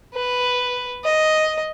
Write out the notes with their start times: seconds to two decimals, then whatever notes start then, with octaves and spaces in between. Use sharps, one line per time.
0.14 B4
1.04 D#5